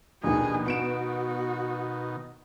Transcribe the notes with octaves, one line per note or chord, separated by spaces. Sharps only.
A#1 D#2 B2 D#3 G#4
B3 F#4 D7 E7